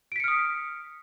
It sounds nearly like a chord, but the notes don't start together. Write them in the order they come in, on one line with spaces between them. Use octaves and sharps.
D7 B6 C#7 F6 D#6